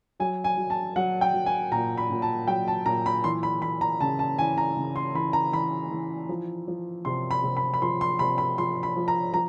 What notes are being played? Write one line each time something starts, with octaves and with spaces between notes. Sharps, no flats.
F#3 G#5
G#5
F#3
A5
F#3 F#5
G5
F#3
G#5
A#2 A#5
B5
A#2
A5
F#3 G5
A5
A#2 A#5
B5
E3 C6
B5
E3 B5
A#5
C#3 A5
A5
E3 G#5
A#5
C#3
C6
E3 B5
A#5
E3 B5
E3
F3
F3
C3 C6
B5
C3
B5
B5
F3 C6
C6
C3 B5
B5
F3 C6
B5
F3
A#5
F3 A#5